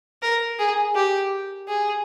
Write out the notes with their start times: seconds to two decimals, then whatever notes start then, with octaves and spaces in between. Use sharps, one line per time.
0.22 A#4
0.59 G#4
0.95 G4
1.68 G#4